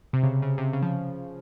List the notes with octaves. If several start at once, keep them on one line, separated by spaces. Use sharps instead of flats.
C3
C#3
C#3
C3
C#3
F3